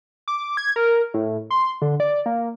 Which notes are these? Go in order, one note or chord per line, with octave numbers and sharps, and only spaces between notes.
D6
G#6
A#4
A2
C6
D3
D5
A#3